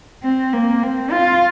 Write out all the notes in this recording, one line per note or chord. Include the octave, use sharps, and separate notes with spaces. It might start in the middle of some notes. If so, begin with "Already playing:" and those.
C4
A#3
C4
F4